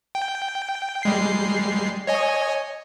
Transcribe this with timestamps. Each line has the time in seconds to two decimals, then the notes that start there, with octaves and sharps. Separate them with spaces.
0.15 G5
1.03 G3 G#3 C7
2.07 C#5 D#5 G#5